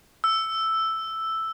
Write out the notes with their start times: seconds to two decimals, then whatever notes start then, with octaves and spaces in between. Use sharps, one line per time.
0.24 E6